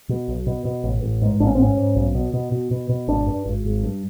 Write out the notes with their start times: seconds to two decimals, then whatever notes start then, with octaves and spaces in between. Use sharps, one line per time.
0.09 B2
0.28 B1
0.47 B2
0.65 B2
0.84 A1
1.02 A1
1.22 G#2
1.40 A1 D4
1.47 C#4
1.55 C4
1.59 G#2 C#4
1.77 G#2
1.96 B1
2.15 B2
2.34 B2
2.52 B2
2.71 B2
2.89 B2
3.08 G#1 D4
3.27 G2
3.46 G#1
3.65 G#1
3.83 G2